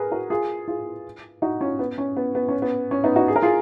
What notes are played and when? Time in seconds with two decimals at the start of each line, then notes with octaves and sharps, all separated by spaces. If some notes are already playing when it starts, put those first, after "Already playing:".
Already playing: G#4 A#4 B4
0.12 F#4 A#4
0.30 F4 G#4
0.68 F4 G#4
1.42 D#4 F#4
1.61 C#4 F4
1.79 B3
1.98 C#4
2.17 B3
2.35 B3
2.48 C#4
2.62 B3
2.91 C#4
3.04 B3 D#4
3.16 D#4 F#4
3.28 G#4
3.36 A#4
3.42 F4 G#4